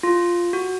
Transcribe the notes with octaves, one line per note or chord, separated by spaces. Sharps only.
F4
F#4